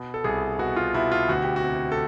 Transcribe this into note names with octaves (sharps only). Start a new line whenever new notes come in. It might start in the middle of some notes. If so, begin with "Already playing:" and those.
Already playing: B2
A4
C2 G#4
B2 F#4
F4
B2 E4
F4
D2 F#4
G4
F#4
C3
A4